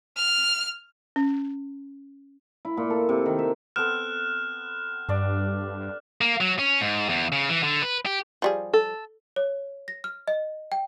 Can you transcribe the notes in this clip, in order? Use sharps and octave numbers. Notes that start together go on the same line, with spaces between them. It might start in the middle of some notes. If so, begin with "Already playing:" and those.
F6
C#4
E4
A#2
A4
C3
D#3
E5
B3 C4 A4 F6 F#6 E7
G2 D4 D5
A#3
F#3
C#4
G#2
E2
C#3
E3
D3
B4
G4
F3 G3 G#4
A4
C#5
A#6
F6
D#5
G5